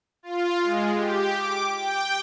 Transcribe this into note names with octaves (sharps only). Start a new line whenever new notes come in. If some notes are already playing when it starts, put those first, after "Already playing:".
F4
G#3
G4
D6
G5